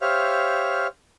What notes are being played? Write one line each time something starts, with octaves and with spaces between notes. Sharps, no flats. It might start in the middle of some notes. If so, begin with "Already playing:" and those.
G4 C5 C#5 E5 F5 F6